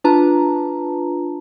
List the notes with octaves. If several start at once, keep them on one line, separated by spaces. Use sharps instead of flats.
D4 F4 B4 A5 A#5